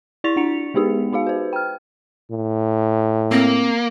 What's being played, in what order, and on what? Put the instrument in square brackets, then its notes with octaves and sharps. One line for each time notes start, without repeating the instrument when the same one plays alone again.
[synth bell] E4 D5 C#6 A6 B6 F7
D4 F#5 C#7 F7
G#3 B3 D#4 G4 G#4
D#4 F#4 G#4 F5
B4 C5
G5 F6
[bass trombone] A2
[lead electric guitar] A#3 [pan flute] C4